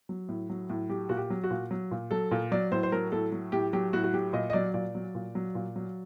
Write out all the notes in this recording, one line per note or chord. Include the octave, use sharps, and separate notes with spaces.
F#3
A2
F#3
A2
F#3 G4
A#2 F#4
G4
F#3
F#4
A#2
F#3
A#2
F#3 A4
A#2
F#3 D5
A2 C5
C5
F#3 A#4
A2 A4
F#3
A2 G4
F#3 G4
A2 F#4
F#4
F#3 G4
A#2 D#5
D#5
F#3 D5
A#2 D5
F#3
A#2
F#3
A#2
F#3